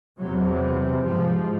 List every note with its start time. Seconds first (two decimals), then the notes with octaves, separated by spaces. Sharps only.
0.19 E2 C3 F#3
1.05 G#2 F3